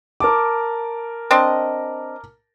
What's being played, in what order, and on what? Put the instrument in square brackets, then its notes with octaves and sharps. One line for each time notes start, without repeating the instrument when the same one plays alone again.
[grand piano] A#4 A5 D6
[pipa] C4 D4 D#5